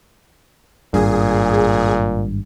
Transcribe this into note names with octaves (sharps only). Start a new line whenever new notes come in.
G#1 G2 A#2 G#4